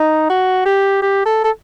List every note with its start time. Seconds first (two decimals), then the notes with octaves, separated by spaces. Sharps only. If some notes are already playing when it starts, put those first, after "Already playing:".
Already playing: D#4
0.30 F#4
0.66 G4
1.02 G4
1.26 A4
1.44 A4